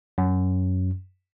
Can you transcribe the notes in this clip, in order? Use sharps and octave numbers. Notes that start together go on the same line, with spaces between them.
F#2